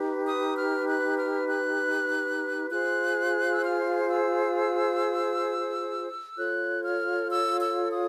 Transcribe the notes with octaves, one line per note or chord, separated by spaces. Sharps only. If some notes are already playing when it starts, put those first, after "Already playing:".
Already playing: D#4 G4 B4
D#6
F6
F#6
F6
F#6
F4 G#4 C5 F#6
E6
F6
E6
F4 A4 C#5 F#6
F6
E6
E6
D#6